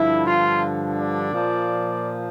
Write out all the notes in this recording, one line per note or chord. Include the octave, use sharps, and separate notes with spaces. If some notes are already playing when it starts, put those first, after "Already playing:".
Already playing: G2 D3 F3 E4
F4
D5
A#2 F3